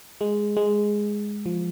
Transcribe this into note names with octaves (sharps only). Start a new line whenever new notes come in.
G#3
G#3
F3